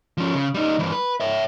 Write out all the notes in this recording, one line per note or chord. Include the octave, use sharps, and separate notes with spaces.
F3 C#4
C#3
G3 D#4
G2 E3
B4
C#5 E5